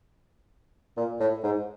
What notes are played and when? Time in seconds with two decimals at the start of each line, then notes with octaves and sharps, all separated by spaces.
0.97 A#2
1.20 A2
1.43 G#2